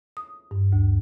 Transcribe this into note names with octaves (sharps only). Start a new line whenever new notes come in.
D#6
G2
D2